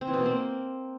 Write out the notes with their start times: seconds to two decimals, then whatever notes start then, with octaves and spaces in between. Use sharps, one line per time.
0.01 C4
0.07 E3
0.13 B2
0.20 A#3
0.26 C4